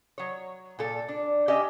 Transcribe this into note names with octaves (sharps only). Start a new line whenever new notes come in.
F#3 C#5
A#2 A4
D4
C#4 G4 D#5 E5